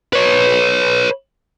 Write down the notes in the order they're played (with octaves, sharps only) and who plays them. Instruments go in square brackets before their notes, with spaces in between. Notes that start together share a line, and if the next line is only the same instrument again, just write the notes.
[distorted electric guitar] B4 C#5